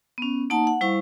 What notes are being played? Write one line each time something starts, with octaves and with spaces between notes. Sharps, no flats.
B3 C#4
A#3 D#4 F#5 A5
F#5
G3 E4 C5 F5 C#6